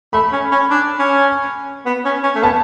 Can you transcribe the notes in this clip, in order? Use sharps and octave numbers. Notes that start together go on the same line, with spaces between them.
A3 B5
C#4
C#4
D4
C#4
B3
C#4
C#4
A3
B3 A5